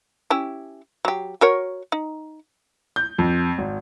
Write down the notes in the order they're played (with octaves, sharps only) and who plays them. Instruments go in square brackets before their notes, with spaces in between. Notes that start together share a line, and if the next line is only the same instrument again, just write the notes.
[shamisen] C#4 E4 G4
F#3 G4
F#4 A#4 C#5
D#4
[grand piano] G6
F2
G#1